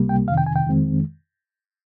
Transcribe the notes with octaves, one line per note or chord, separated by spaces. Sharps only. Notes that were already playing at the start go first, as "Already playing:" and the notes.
Already playing: C#2 C3 G3 A#3
G5
F2 C3 D#3 F5
G5
G#5
G5
F2 D#3 G#3 C4